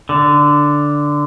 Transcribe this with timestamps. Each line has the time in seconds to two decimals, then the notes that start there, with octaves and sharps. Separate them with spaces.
0.09 D3